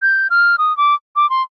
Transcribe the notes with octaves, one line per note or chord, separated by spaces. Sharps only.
G6
F6
D#6
D6
D6
C6